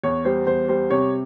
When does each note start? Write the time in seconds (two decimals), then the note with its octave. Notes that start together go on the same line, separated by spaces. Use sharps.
0.03 E2 C#5
0.25 G3 C5
0.47 E2 C5
0.68 G3 C5
0.90 C3 C#5